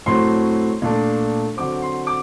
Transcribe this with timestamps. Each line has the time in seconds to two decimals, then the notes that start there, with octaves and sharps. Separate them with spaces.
0.06 A2 F#3 A3 C4 C6
0.82 A#2 A3 D4
1.57 D3 F#3 C4 D6
1.82 C6
2.07 D6